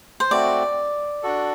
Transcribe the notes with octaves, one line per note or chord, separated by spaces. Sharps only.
C5
A3 C4 F#4 D5
D4 F#4 A4